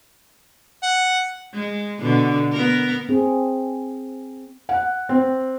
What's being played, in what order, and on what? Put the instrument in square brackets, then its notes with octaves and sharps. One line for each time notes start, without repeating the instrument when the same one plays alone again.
[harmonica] F#5
[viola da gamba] G#3
B2 D3
B3 A#4
[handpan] C4 G#4
[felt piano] F#5
C4